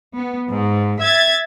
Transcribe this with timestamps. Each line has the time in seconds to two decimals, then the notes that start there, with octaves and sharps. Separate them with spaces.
0.16 B3
0.49 G#2
1.01 E5 G#6 A6